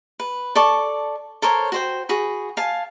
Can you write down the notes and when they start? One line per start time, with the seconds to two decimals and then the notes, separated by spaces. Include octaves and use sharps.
0.20 B4
0.55 A4 D5 A5 C#6
1.42 A4 A#4 C5 C#5
1.72 F#4 C5 G5
2.09 F#4 G#4 B5
2.57 F5 G#5 A5